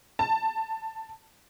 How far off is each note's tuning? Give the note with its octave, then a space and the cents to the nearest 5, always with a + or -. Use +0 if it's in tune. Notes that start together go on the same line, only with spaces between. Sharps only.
A5 +10